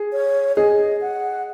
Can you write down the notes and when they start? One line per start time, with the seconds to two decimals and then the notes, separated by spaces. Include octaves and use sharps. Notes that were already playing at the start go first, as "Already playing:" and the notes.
Already playing: G#4
0.12 C#5
0.56 G#4 D#5
1.01 F#5